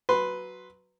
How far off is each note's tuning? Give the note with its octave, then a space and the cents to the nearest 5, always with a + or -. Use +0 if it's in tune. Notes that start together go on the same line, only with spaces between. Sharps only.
F#3 +0 B4 +0 C6 +0